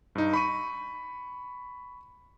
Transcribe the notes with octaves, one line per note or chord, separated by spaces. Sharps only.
G2 D#4
B5 C#6 D#7